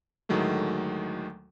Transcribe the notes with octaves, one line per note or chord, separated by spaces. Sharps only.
D2 A2 D#3 F#3 G#3 A3